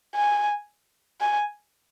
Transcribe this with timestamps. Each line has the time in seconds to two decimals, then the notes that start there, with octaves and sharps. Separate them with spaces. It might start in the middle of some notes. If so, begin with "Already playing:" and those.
0.15 G#5
1.20 G#5